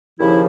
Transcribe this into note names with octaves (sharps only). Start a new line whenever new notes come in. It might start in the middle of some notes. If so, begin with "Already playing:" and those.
D#2 C#3 F3 E4